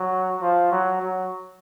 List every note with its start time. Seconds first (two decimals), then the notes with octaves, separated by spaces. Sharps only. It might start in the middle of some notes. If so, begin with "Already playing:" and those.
Already playing: F#3
0.42 F3
0.72 F#3
1.02 F#3